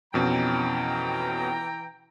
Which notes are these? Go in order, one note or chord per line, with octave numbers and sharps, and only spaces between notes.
F2 B2 E3 C#4 G5 A#5